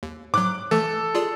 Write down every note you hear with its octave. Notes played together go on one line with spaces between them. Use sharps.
D#2
G#2 F#3 D6 F#6
E3 A3 A4
F4 G#4 D5